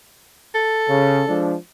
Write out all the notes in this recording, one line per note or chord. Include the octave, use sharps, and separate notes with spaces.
A4
C#3
F3 G#3 D4